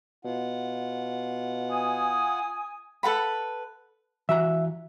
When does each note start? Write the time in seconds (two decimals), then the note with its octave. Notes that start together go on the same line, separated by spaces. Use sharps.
0.25 B2 F4 F#5
1.68 G#5 D#6
3.03 A4 B4 F#5 B5
4.29 E3 F#4 E5 A#5